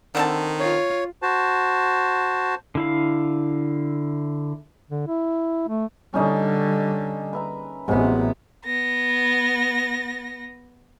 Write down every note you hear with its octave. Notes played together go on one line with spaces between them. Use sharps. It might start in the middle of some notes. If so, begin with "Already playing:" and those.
D3 D#3 C4 A5
F4 C#5
F#4 C5 A5
D3 E4 F5
D3
E4
A3
D3 G3 C#4 D#4 D#5
B4 E5 A#5
A1 C3 F#3 G#3 B3
B3 A#6